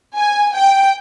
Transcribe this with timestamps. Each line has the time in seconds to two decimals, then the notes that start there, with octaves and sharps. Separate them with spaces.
0.17 G#5
0.55 G5